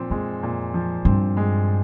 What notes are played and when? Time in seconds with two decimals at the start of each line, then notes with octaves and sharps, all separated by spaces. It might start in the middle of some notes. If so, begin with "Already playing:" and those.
Already playing: A#2 F3 C4
0.10 F2 G#3
0.43 A#2
0.74 F3
1.05 G2 C4
1.37 G#3